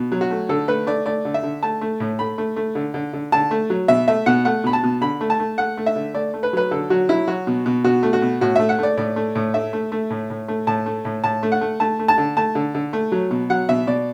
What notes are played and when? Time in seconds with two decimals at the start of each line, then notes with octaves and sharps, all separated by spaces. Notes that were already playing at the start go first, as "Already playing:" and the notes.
Already playing: B2
0.12 F#3
0.21 F#4
0.31 A3
0.49 D3 A4
0.68 A3 B4
0.87 A3 D5
1.06 A3 D5
1.25 D3
1.34 E5
1.43 D3
1.63 A3 A5
1.81 A3
2.00 A2
2.19 A3 B5
2.38 A3
2.56 A3
2.75 D3
2.94 D3
3.13 D3
3.32 D3 A5
3.51 A3
3.70 F#3
3.88 B2 E5
4.08 A3 E5
4.26 B2 F#5
4.45 A3 F#5
4.64 B2 B5
4.73 A5
4.83 B2
5.01 D3 B5
5.21 A3
5.30 A5
5.39 A3
5.58 A3 F#5
5.77 A3
5.86 E5
5.96 D3
6.14 A3 D5
6.34 A3
6.43 B4
6.53 F#3 B4
6.71 D3 A4
6.90 F#3 F#4
7.09 F#3 E4
7.28 F#3 F#4
7.47 B2
7.66 B2
7.84 B2 F#4
8.03 A3
8.13 F#4
8.22 B2
8.41 A2 F#4
8.56 A3 E5
8.69 F#5
8.79 A3 D5
8.97 A2 D5
9.16 A3
9.35 A2
9.54 A3 E5
9.73 A3
9.92 A3
10.10 A2
10.30 A2
10.48 A3
10.67 A2 A5
10.86 A3
11.05 A2
11.24 A2 A5
11.43 A3
11.52 F#5
11.61 A3
11.80 A3 A5
11.99 A3
12.08 A5
12.18 D3
12.37 A3 A5
12.55 D3
12.75 D3
12.93 A3
13.12 F#3
13.31 B2
13.50 F#3 F#5
13.69 B2 E5
13.87 B2 D5